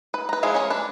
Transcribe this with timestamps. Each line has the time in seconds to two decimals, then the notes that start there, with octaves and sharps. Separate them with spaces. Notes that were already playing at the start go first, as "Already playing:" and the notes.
0.14 B4
0.29 B4 A#5
0.43 F3 G#3 E4 F4 G#4
0.54 C#4 G#4 A#4 C#5
0.70 D4 B4